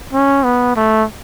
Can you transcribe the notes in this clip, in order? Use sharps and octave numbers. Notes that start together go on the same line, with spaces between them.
C#4
B3
A3